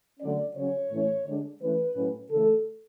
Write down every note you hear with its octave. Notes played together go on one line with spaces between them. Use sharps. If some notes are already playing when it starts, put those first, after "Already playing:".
D3 F#3 A3 C#4 D5
C#3 F#3 C#4 C#5
A2 E3 A3 C#4
D3 G#3 D4
E3 A3 C#4 B4
A2 F#3 C#4
C#3 E3 A3 A4